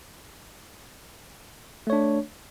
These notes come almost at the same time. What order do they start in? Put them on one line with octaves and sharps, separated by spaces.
A3 C#5 D4